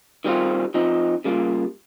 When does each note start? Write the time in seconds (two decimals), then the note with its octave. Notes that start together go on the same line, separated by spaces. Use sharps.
0.24 D#3 G3 C4 F4
0.74 F3 C4 D#4
1.24 C#3 G3 A#3 F4